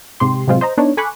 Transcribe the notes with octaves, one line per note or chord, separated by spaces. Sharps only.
G#2 C3 G4 C6
A2 C3 F#3 G#3 C4 F4
C5 D#5 A#5
B3 D4 D#4 C#5
A4 G#5 B5 C#6 D6 F#6